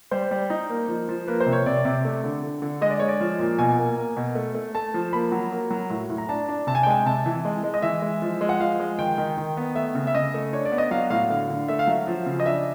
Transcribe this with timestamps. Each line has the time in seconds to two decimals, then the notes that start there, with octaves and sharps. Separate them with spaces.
0.11 G3 C5
0.31 G3
0.50 D#4
0.69 A#3
0.88 F3
1.09 F3
1.28 A#3 B4
1.40 C5
1.46 C3
1.53 C#5
1.66 C3 D5
1.85 C3
2.05 A3
2.24 D3
2.43 D3
2.62 D3
2.81 G#3 D#5
2.90 D5
2.99 G#3 C#5
3.08 D5
3.20 F3
3.39 A#2
3.59 B2 G#5
3.79 A#3
3.97 A#3
4.17 B2
4.35 A3
4.55 A3
4.75 A3 A5
4.94 F3
5.13 A#3 B5
5.32 F#3
5.52 A#3
5.70 F#3
5.90 A2
6.10 A2
6.18 A#5
6.29 D4 A5
6.49 D4
6.67 C3 A5
6.75 G#5
6.83 G5
6.87 G#3 G#5
7.05 C3 A5
7.26 E3
7.45 G#3
7.63 G#3
7.74 D#5
7.82 E3 E5
8.02 G#3
8.22 F3
8.41 G#3
8.49 F#5
8.60 F3 F5
8.80 G#3
8.99 D#3 G5
9.18 D#3
9.38 D#3
9.57 B3
9.75 A3 E5
9.95 C#3
10.07 E5
10.15 C#3 D#5
10.34 A3
10.52 D4 C#5
10.65 D5
10.72 B3
10.78 D#5
10.91 F#3 F5
11.10 A2 F5
11.30 D3 F5
11.49 D3
11.68 A3 E5
11.79 F5
11.87 F#3 E5
12.07 F3
12.26 C#3
12.40 D#5
12.45 D4 E5